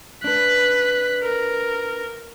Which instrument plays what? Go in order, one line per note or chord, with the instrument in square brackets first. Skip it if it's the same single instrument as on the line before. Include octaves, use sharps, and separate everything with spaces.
[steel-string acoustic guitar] D4 B4 [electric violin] F#6 B6
[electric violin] A#4